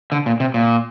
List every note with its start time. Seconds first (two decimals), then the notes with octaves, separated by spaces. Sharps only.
0.12 D3
0.26 A#2
0.40 C3
0.54 A#2